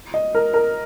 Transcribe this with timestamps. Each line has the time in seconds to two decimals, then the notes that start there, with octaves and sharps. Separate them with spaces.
0.14 D#5
0.35 A#4
0.54 A#4